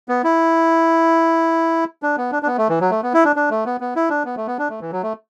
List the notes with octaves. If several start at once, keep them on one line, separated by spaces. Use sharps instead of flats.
B3
E4
D4
B3
D4
D4
B3
A3
E3
F#3
A3
B3
E4
D4
D4
A3
B3
B3
E4
D4
B3
A3
B3
D4
A3
E3
F#3
A3